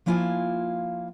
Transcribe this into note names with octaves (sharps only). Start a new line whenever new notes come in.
F3 A#3 E4 F4 F#5 G#5